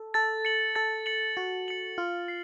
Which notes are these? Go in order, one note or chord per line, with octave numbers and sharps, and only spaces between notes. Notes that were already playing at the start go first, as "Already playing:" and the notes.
Already playing: A4
A4 A6
C#7 F#7
A4 A6
C#7 F#7
F#4 A6
C#7 F#7
F4 F6
C7